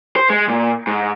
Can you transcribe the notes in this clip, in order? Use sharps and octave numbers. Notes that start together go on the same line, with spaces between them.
C5
G#3
A#2
G#2